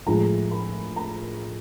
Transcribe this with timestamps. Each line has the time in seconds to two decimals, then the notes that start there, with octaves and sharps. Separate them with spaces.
0.06 A2 F3 G#3 A#5
0.51 B5
0.96 A#5